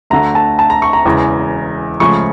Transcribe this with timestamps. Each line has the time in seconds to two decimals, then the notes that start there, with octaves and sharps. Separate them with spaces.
0.10 D2 D3 A3 A#5
0.35 A5
0.59 A5
0.70 A#5
0.82 C#6
0.93 A#5
1.05 E1 E2 C#3
2.00 C#2 C#3 F3 A3 C#6